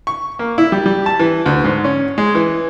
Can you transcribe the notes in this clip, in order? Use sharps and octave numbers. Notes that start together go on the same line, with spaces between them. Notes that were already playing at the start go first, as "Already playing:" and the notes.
C#6
A#3
E4
G3
G3
A5
E3
D2
G#2
C#4
G#3
E3